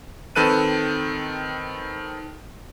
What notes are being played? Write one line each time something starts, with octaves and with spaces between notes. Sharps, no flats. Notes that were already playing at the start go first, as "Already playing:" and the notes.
D#3 C4 A4 B4 F#6 D#7